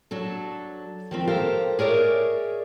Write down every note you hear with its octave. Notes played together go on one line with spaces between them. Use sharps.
F#3 D4 A4
D#3 F3 C4
G4 A4 A#4 C5 F5
G#4 A#4 C#5 D5 E5